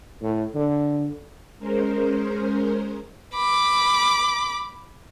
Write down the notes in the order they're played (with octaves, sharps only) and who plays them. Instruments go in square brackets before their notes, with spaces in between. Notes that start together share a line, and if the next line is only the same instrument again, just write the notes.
[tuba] A2
D3
[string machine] G#3 C#4 A#4 C5
[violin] B5 D6